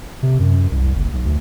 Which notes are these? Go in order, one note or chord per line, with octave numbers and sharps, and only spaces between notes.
C3
F#2
C2
F#1
B1
D2